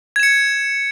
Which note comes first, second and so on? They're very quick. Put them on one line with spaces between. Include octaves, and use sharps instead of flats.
G#6 E7 C#7